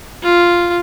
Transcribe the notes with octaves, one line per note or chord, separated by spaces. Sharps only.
F4